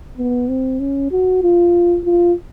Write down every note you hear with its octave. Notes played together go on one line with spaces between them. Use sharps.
B3
C4
C#4
F#4
F4
F4